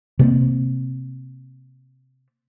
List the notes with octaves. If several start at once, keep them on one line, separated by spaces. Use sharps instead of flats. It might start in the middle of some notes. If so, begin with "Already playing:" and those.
C3 A#3 C4